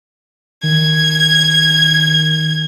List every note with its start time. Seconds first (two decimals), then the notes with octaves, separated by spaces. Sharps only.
0.63 D#3 G#6